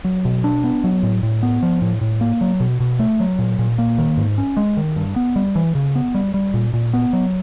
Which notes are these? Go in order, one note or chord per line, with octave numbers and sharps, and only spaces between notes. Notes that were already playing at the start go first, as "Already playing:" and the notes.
F#3
B2
D4
B3
F#3
A2
A2
B3
F3
A2
A2
A#3
F#3
B2
B2
A3
F#3
A#2
A#2
A#3
D#3
G#2
C#4
G#3
D#3
G2
B3
G3
E3
C#3
B3
G3
G3
A#2
A#2
B3
F#3